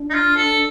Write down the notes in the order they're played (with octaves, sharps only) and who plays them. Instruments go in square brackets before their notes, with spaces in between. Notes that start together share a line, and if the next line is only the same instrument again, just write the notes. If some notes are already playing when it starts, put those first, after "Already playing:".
Already playing: [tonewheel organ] D4
[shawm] D#4
F4
A4